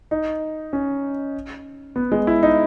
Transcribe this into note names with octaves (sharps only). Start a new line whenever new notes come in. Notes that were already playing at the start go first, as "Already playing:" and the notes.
D#4
C#4
B3
G#3
E4
D#4